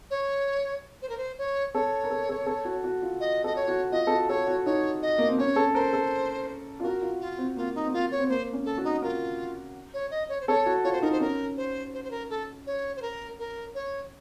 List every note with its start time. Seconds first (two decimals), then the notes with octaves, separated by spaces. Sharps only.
0.11 C#5
1.02 C5
1.09 A#4
1.18 C5
1.38 C#5
1.74 A4 C#5
2.03 A#4
2.11 A4
2.29 A4
2.46 A4
2.65 F#4
2.84 F#4
3.02 F4
3.20 D#5
3.44 A4 D#5
3.56 C#5
3.68 F#4
3.92 F4 D#5
4.07 A4
4.11 F#4
4.29 A4 C#5
4.47 F#4
4.66 D#4 C#5
5.02 D#5
5.18 A#3
5.28 C4
5.38 C#4 C#5
5.56 A4
5.75 A#4 C5
5.93 A4
6.80 F4
6.84 F#4 A#4
7.02 F4
7.21 F4
7.38 C4
7.57 A#3 F4
7.75 D#4
7.84 C4
7.93 A#3 F4
8.11 C#5
8.19 C4
8.29 A#3 C5
8.53 C#4
8.65 A4
8.78 F#4
8.84 D#4
9.02 F4 A#4
9.94 C#5
10.11 D#5
10.29 C#5
10.41 C5
10.48 A4 C#5
10.66 F#4
10.84 F4 C#5
10.93 C5
11.02 D#4 A#4
11.12 C5
11.20 C#4 A#4
11.57 C5
11.94 C5
12.04 C5
12.11 A#4
12.30 A4
12.67 C#5
12.97 C5
13.02 A#4
13.39 A#4
13.75 C#5